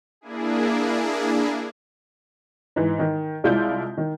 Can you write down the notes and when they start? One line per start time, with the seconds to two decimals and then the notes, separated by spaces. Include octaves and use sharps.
0.21 A#3 D4 E4 G#4
2.76 G#2 E3
2.99 D#3
3.44 C2 G#3 E4 F4 D5 G6
3.97 D#3